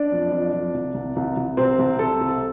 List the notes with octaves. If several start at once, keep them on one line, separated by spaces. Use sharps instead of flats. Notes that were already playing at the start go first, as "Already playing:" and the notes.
Already playing: D4 D5
F2
F2
F2
C2
C2
C2
C2
C3 C4 C5
C2
C3 A4
C2